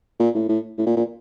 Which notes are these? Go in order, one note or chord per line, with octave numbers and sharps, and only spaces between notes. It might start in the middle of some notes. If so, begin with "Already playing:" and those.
A#2
A2
A2
A2
A#2
A#2